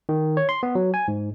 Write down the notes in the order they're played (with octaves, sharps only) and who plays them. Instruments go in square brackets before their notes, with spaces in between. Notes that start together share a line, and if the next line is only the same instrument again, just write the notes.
[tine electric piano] D#3
C#5
C6
B3
F#3
G#5
G#2